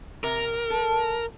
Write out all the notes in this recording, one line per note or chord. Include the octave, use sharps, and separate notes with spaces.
C3 A#4
A4